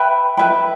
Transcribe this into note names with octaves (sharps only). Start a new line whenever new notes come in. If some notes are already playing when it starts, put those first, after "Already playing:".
Already playing: B4 E5 G5 B5
B4 E5 G5 B5